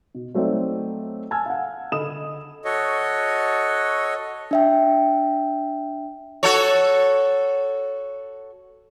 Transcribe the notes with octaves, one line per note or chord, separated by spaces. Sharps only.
B2
F#3 A3 C4 D#4 C5 D5
G#5 A5 E6 F6 G#6
F5 F#5
D3 A4 D#5 B5 D#6 E7
F#4 A4 C#5 D#5
D4 E5 G5
F#4 A4 C#5